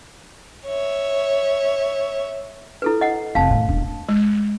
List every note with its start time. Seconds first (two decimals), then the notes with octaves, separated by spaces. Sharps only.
0.66 C#5 E5
2.82 E4 A4 B4
3.01 D#5 F#5
3.35 F1 F5 A5
3.51 A2 D#3
3.68 E1 D4
4.09 G#3